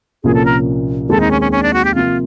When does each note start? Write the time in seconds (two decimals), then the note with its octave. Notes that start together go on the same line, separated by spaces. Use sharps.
0.24 C2 A#2 F3 A#3 C#4 G#4
0.34 A4
0.45 A#4
1.09 D#2 D#3 G#3 C4 A4
1.20 D#4
1.31 C#4
1.41 C#4
1.52 C#4
1.63 D4
1.73 F#4
1.85 G4
1.95 C3 F3 A#3 F4